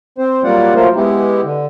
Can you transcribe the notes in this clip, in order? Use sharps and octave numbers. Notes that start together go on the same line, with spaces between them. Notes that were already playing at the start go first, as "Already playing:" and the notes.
C4 C5
F#3 G3 A#3 F4 D5 F#5
F#3 A3 A#3 F4 A#4 C5
G#3 B3 E4 G4
D3